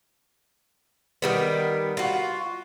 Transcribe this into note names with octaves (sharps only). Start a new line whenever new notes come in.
D#3 G3 B3
F4 F#4